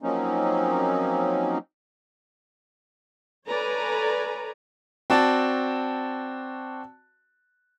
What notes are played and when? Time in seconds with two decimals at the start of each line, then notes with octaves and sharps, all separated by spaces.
0.02 F3 F#3 A#3 C4 C#4 D#4
3.49 A4 B4 C#5 D5 G#5 A#5
5.10 C4 F#4 D5 A5